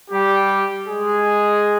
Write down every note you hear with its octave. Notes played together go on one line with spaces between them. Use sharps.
G3 G4
G#3 G#4